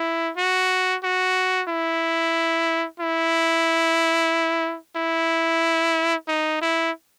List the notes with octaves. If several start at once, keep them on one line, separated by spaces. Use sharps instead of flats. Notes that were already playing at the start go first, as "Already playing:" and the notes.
Already playing: E4
F#4
F#4
E4
E4
E4
D#4
E4